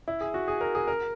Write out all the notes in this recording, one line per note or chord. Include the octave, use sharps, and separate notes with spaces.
E4
G#4
F#4
G#4
A#4
G#4
A#4